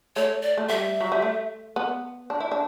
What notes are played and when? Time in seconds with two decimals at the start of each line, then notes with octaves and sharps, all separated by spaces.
0.16 A3 C#5
0.42 D5
0.57 A3
0.69 G3 E5
1.00 F#3
1.12 G3
1.22 A3
1.76 B3
2.30 D4
2.40 E4
2.51 D4